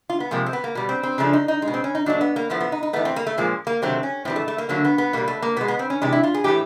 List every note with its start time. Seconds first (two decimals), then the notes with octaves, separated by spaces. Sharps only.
0.10 F4
0.20 B3
0.31 C3 F3 G#3 A#3
0.46 C4
0.53 B3
0.64 A#3
0.75 B2 G3
0.89 C4
1.03 C4
1.18 C#3 F3 A3 D4
1.33 D#4
1.48 D#4
1.62 G#3
1.68 B2
1.74 C4
1.84 C#4
1.95 D#4
2.06 A#2 F#3 A3 D4
2.21 B3
2.36 A#3
2.50 A2 F3 A3 B3
2.60 B3
2.72 D#4
2.83 D#4
2.93 A2 E3 A3 B3
3.05 C4
3.16 A#3
3.27 A3
3.38 A#2 F3 G#3 A#3
3.67 A#3
3.82 C3 D#3 F#3 A3 C4
4.03 C#4
4.25 A2 E3 G3 C4
4.36 A3
4.48 A3
4.58 A#3
4.69 D3 F#3 A3 A#3
4.85 B3
4.98 B3
5.13 B2 G3 A#3
5.28 A3
5.42 A#3
5.56 B2 B3
5.61 G#3
5.68 B3
5.79 C4
5.90 C#4
6.01 C3 E3 G#3 D4
6.13 E4
6.23 F4
6.34 G#4
6.44 A2 E3 A3 G4